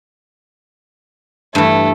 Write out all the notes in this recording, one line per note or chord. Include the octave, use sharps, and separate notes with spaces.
G2 E3 A3